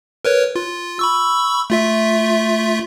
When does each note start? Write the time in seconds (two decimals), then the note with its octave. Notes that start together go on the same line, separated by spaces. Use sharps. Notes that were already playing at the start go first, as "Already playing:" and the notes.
0.25 A#4 B4 C#5
0.56 F4
0.99 B5 C#6 E6
1.70 A3 F4 E5